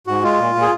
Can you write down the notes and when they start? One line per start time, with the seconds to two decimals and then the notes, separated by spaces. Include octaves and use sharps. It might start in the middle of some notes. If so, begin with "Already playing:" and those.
0.07 G#2 F#4
0.23 G#3 F4
0.39 A#2
0.55 A#2
0.62 G#4